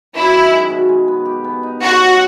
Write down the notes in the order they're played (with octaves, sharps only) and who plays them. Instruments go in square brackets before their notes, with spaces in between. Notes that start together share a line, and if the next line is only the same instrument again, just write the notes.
[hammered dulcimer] F#2 [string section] E4
[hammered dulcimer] D#3
G#3
B2
G#3
B3
G4
B3
D#4
[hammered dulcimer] C#4 [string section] F#4
[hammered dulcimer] F#3